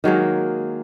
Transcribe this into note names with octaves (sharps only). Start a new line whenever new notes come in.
D#3 F#3 G#3 A#3